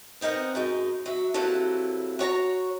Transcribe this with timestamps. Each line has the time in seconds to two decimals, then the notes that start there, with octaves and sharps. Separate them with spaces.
0.21 B3 C4 D#4 A#4 F#5
0.55 F#2 G#3 D#4
1.06 F#3 E5
1.34 C3 F#3 A#3 E4 A4 B4
2.19 F#4 C#5 A5 A#5